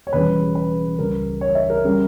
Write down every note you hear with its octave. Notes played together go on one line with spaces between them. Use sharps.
C#5
E1 E2 C#3 G3 B4
B4
C#2 C#3 G3 A#4
C#5
E5
A#4
C#3 G3